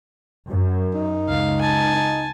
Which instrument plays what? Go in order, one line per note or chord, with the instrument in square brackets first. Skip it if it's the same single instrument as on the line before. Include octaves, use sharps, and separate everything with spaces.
[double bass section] F#2
[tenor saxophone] D#4
[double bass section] C#2 [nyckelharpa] F5
[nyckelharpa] G#5 A5
[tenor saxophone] D#4